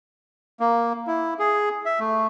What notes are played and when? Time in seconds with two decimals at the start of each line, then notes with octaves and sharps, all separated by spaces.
0.60 A#3
1.07 E4
1.39 G#4
1.86 E5
2.00 A3